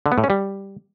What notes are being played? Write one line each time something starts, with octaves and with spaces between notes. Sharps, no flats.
D3
B3
A2
C#4
G3